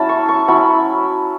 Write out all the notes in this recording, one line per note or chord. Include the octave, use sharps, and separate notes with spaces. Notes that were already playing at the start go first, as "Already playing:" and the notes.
Already playing: F#3 C#4 E4 F#5 A5 B5
C#6
C#6
F#3 C#4 E4 B5